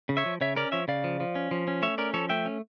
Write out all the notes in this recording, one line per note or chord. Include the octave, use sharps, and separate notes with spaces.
C#3
C#5 E5
F3
C#3 C#5 E5
C#4 A#4 D5
F3 C#5 E5
C#3 D5 F5
F3
F3
C#4
F3
C#4
A3 C#5 E5
C#4 A#4 D5
F3 A4 C#5
A3 E5 G5
C#4